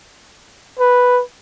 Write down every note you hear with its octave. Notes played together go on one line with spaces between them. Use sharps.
B4